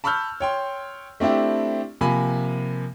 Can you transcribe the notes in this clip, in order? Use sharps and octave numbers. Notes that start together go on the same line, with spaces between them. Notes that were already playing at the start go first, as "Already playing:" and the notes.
A5 B5 C#6 E6 F6 G6
C#5 G5 C6
A3 C4 D4 E4 G4
C3 F3 A#3 G#5 B5